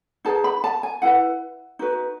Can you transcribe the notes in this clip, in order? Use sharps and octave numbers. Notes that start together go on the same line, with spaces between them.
D#4 G#4 B4 A5
B5
A5
G#5
E4 B4 F#5
D#4 F#4 B4